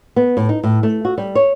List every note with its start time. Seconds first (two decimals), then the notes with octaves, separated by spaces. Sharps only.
0.16 B3
0.37 A2
0.49 D#4
0.64 A2
0.83 A3
1.05 F#4
1.18 G3
1.35 C#5